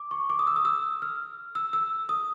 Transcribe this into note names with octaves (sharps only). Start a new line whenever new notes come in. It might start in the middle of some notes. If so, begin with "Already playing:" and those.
Already playing: D6
C#6
D6
D#6
E6
D#6
E6
F6
E6
E6
D#6